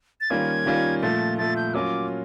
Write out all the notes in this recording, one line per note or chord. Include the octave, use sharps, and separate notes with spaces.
A6
D#3 G3 A#3 C#4 F4 G#6
D#3 G3 A#3 C#4 F4
A#2 F3 A3 A6
A#2 F3 A3 A6
G6
F#3 A#3 C#4 F4 D6